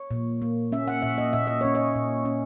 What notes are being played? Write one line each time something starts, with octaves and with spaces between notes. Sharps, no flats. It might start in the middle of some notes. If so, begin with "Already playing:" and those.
Already playing: C#5
A#2
A#3
C#4 E5
F#5
A#2 E5
D#5
A#2 E5
D#5
C#4 C#5
D#5
A#2
C#4